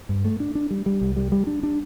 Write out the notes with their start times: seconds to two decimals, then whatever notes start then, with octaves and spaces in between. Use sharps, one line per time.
0.09 G2
0.25 A3
0.40 D4
0.55 D4
0.71 G3
0.86 G3
1.01 C2
1.16 G3
1.32 G3
1.47 D4
1.63 D4